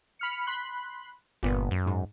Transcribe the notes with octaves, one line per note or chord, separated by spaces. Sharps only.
B5 F6 C#7
B5 C6 F#6
G1 A#2 B3
F#2
G#2